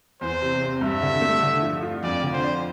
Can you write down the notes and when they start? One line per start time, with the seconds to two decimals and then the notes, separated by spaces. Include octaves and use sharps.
0.21 E2 C5
0.42 C3
0.62 C4
0.81 G2 E5
1.02 D3
1.21 A3
1.43 D3
1.62 F3
1.83 F4
2.03 F2 D5
2.23 D3
2.33 C5
2.44 D4